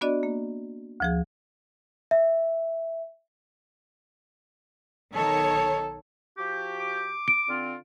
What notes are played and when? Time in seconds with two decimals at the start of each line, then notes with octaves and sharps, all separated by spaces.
0.01 B3 D4 F#4 D5 D#5
0.23 A#3
1.00 D2 F3 G#4
2.11 E5
5.14 B1 D#3 A4 C#5
6.37 F3 F#4 G4
6.78 D6
7.28 D7
7.48 D3 C4 F4